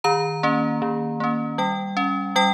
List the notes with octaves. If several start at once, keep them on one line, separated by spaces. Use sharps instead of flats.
D#3 A#5
A#3 C#4
D#3
A#3 C#4
G3 G5
C#4
G3 G5